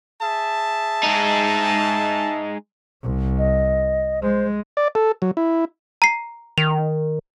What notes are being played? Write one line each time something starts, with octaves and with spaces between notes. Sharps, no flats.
G#4 E5 A5
G#3 D#4
C2
D#5
G#3 C5
D5
A4
F#3
E4
A#5 C7
D#3 F7